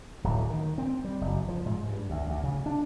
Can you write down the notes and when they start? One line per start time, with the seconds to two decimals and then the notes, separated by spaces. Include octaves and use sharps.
0.24 D1
0.49 D#3
0.78 C4
1.05 G3
1.21 F#1
1.49 F3
1.66 G#2
1.88 G2
2.10 D2
2.27 D2
2.44 C#3
2.66 D4